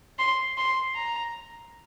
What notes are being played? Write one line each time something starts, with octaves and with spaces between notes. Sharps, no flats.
C6
C6
A#5